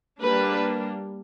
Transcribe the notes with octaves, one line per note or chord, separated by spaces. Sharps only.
G3 A#3 D4 B4